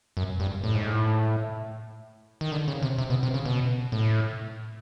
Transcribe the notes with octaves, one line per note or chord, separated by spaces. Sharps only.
F#2
G2
A2
G#2
A2
D#3
D3
C#3
C3
C3
B2
C3
C#3
B2
A2